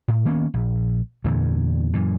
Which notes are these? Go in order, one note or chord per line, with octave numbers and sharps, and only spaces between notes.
A2
D#3 A#3 B3 C#4
A#1
E2 G2 A#2 D3
F#2 A#2 E3